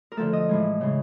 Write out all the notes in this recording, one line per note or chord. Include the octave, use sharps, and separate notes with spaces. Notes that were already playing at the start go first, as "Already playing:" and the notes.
A#4
D3 F3 A3 A4
D#5
A2 E3 G#3
C#3 E3 G#3